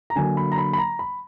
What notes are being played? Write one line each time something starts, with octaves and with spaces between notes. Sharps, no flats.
A#5
D3 F#3 A#3 G#5
B5
A#5
B5
B5
A#5
B5